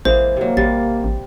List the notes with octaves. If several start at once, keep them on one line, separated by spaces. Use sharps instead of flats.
A1 E3 G#3 A#3 C5
C3 F#3 A#3
A1 C3 G3 F5 A6
A1